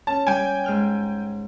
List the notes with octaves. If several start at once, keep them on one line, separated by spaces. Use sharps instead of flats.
C#4 A5
G3 G5 G#5
G#2 F6 G6